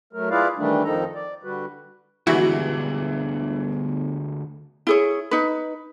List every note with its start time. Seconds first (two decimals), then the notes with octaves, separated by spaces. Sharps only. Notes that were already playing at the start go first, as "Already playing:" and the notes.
0.13 F#3 A3 A#4
0.30 E4 F4 G#4 B4 D5 F5
0.58 D#3 E3 G3 A3 D4
0.84 F2 D#3 F3 D#4 A4 A#5
1.15 D5
1.44 D3 G3 F#4 B4
2.27 G1 D2 E3 G3 G#3 E4 F#4
4.87 E4 G#4 C#5
5.31 D#4 B4